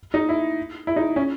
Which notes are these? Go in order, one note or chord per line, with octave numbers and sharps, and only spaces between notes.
D#4
E4
E4
D#4
C#4